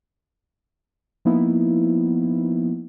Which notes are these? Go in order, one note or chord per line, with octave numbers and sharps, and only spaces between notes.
F3 A#3 B3 D#4 E4